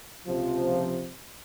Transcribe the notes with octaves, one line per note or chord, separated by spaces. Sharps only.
C#2 C3 F3